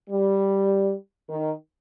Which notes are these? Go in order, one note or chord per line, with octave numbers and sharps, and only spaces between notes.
G3
D#3